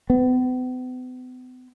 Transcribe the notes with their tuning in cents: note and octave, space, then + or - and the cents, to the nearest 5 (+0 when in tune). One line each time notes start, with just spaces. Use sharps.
B3 +45